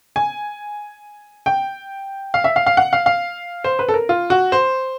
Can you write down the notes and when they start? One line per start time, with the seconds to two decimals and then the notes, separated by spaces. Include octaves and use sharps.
0.16 G#5
1.46 G5
2.34 F5
2.44 E5
2.56 F5
2.66 F5
2.77 F#5
2.93 F5
3.06 F5
3.64 C5
3.79 B4
3.89 A4
3.94 A#4
4.09 F4
4.30 F#4
4.52 C5